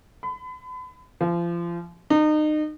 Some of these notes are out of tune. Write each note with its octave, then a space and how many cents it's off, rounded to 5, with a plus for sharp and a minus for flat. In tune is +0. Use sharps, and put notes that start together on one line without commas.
B5 +40
F3 -30
D#4 -30